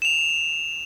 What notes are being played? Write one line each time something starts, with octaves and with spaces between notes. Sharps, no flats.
E7 F7